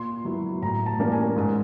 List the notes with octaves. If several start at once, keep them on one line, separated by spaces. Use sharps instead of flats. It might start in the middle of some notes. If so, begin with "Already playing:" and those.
Already playing: A#2 C6
F#3 B3 E4
A2 A#5
A5
E3 G3 A#3 C#4
G#5
G#2